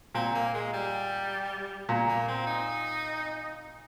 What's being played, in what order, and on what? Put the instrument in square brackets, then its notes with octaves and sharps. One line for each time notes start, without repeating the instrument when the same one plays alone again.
[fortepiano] A#2 [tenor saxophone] C4
[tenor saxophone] A#3
G#3
G3
[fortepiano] A#2
[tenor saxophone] A#3
C4
D#4